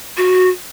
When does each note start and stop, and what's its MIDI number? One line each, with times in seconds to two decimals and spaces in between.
0.17 0.50 66